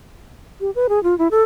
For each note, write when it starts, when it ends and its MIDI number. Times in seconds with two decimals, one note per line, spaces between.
0.61 0.70 67
0.75 0.87 71
0.89 1.02 68
1.03 1.17 65
1.18 1.28 64
1.31 1.43 69